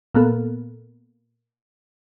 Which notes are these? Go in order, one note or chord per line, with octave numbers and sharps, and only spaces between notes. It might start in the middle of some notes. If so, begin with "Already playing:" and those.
A#2 A#3 B3 A4